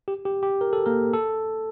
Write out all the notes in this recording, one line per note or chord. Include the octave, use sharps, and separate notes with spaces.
G4
G4
G4
A#4
A4
A#3 A#4
A4